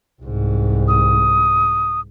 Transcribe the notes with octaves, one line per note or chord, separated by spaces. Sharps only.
C2 G#2
D#6